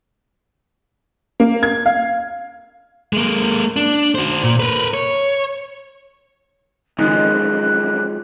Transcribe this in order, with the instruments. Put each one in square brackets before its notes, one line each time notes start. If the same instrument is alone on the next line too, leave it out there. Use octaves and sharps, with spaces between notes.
[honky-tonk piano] A#3
G#6
F5
[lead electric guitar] G#3 A#3
D4
F#4 C5
A#2
A#4 B4
C#5
[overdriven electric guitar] F#2 F3 [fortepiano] D#3 [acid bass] G#3 [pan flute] F#6